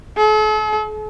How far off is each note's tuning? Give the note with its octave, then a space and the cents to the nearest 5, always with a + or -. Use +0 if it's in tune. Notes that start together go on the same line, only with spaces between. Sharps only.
A4 -45